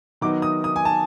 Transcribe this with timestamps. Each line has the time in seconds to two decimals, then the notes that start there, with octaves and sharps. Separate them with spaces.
0.21 D#3 F#3 B3 D#4 D6
0.42 D#6
0.64 D#6
0.76 G#5
0.85 A5